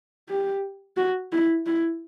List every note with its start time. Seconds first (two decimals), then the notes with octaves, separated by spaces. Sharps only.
0.28 G4
0.97 F#4
1.32 E4
1.66 E4